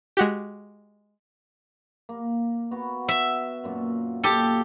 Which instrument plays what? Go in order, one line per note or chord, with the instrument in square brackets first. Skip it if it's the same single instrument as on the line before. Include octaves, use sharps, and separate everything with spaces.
[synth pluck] G#3 F#4 G4
[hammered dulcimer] A#3
B3 F#4
[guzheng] E5
[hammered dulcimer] F#2 A#2
[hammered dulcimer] A#2 [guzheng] G4 A4